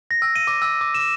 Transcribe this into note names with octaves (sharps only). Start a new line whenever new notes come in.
A#6
E6
D#7
D6
E6
D6
E7